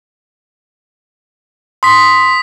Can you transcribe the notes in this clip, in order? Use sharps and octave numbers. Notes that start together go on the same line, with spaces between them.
C6 D#6 B6